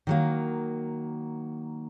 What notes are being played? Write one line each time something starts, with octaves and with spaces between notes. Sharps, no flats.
D#3 F#3 A#3